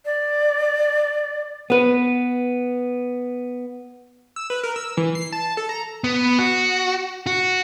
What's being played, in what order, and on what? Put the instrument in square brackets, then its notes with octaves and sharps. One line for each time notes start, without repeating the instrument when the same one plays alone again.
[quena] D5
[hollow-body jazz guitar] B3 B4
[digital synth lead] E6
B4
A#4
E6
E3
C7
A5
A4
A#5
[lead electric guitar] B3
F#4
F#4